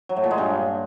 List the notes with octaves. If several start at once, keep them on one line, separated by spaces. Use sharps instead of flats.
F#3
A2
A#2
G#3
G2